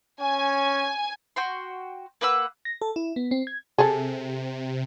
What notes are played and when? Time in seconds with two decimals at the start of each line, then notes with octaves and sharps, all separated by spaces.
0.21 C#4 G#5
1.36 F#4 G5 C6
2.21 A#3 B4 F#5 E6
2.65 A#6
2.81 A4
2.96 E4
3.16 B3
3.31 C4
3.47 G#6
3.78 C3 G#4 A4